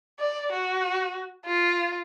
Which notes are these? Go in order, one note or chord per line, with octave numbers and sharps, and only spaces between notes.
D5
F#4
F4